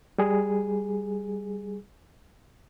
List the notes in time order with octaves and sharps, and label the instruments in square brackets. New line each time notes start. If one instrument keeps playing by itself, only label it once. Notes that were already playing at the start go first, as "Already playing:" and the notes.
[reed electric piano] G3 G#4